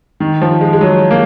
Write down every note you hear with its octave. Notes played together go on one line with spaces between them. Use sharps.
D#3
F3
G#3
G#3
F#3
A#3